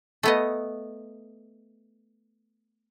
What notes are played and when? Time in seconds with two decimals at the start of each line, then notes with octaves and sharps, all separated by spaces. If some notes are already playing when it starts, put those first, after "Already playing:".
0.23 A3 B3 D#5